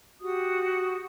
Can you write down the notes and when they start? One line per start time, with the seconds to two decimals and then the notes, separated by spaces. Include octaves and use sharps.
0.20 F#4 G4 D#6